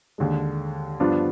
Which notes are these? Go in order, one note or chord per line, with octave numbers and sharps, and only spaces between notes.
D#2 D3 G#3
G2 F3 B3 D4 F4